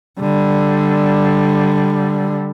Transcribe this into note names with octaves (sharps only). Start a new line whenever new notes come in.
D3 G3